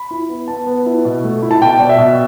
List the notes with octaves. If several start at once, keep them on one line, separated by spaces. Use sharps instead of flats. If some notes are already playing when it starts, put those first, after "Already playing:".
Already playing: B5
E4
B3
B3 A5
B3
E4
B2
A3
E4
A5
B2 G5
B2 D5
E5
B2